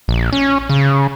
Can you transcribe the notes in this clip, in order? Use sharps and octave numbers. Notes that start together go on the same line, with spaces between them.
A#1
C#4
C#3